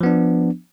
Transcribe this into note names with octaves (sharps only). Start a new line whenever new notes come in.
F3 B3 D4